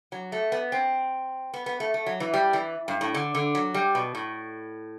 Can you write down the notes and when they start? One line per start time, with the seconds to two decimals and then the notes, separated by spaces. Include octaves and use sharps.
0.12 F#3
0.32 A3
0.52 B3
0.72 C4
1.54 B3
1.66 B3
1.80 A3
1.94 A3
2.06 F#3
2.20 E3
2.34 G3
2.53 E3
2.88 G2
3.01 A2
3.14 D3
3.35 D3
3.55 F#3
3.74 G3
3.95 B2
4.15 A2